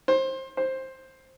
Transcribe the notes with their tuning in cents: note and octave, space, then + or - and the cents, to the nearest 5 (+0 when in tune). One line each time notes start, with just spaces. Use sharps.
C5 +20
C5 +10